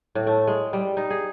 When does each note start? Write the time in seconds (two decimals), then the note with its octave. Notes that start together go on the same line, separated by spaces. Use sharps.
0.15 A2
0.27 A3
0.47 G#3
0.73 G3
0.97 D#4
1.10 G#4